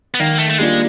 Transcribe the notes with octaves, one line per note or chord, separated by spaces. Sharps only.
B3
D#3 A#3
A3
A3
G3 G#3 A#3 D4 F4